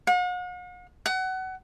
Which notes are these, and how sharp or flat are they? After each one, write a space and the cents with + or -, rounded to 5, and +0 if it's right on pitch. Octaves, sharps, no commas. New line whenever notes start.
F#5 -45
F#5 +25